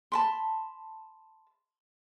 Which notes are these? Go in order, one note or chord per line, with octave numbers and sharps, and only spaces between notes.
A5 B5 C6